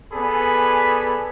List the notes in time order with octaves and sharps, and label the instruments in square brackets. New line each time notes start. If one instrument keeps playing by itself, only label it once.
[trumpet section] B3 G#4 A4 D5 G#5 B5